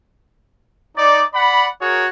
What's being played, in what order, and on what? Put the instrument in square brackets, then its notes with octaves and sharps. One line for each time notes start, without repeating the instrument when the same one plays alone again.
[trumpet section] D#4 D5
D5 F#5 B5
F#4 G#4 A#4 C#5